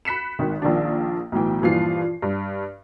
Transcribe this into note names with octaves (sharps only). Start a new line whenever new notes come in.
B5 F#6 B6 C#7 E7
G#1 D#3
A#1 D#3 F3 D4
B1 A2 E3 G5
G2 A#2 E3 F3 F4 C7
G2